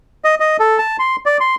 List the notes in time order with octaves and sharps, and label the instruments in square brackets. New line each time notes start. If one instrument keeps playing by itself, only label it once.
[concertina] D#5
D#5
A4
A5
C6
D5
C6